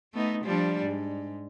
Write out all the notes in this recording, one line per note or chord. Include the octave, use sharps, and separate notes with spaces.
A3 B3 D#4
F3 G3 D4
G#2